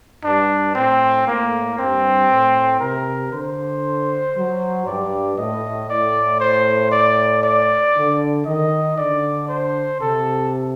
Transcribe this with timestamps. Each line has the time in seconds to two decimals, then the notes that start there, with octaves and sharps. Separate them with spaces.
0.24 G2 D4
0.75 A2 C4
1.27 A2 A#3
1.79 G2 C4
2.30 A2
2.80 C3 A#4
3.32 D3 C5
4.36 F#3
4.86 G2 D5
5.38 A2 D#5
5.89 A2 D5
6.40 C5
6.92 D5
7.43 D5
7.96 D3
8.46 D#3 D#5
8.98 D3 D5
9.49 C5
10.00 C3 A4